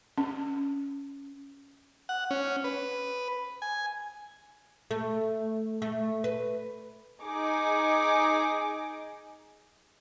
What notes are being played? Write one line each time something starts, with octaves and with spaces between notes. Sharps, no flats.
C#4
F#5
C#4
B4
G#5
A3
A3
B4
D#4 G#4 D6